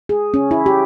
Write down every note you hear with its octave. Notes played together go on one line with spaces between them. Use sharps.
G#4
C#4
E4
G4